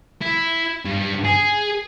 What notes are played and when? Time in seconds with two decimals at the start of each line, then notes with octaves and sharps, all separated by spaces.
0.22 E4
0.85 G2
1.24 G#4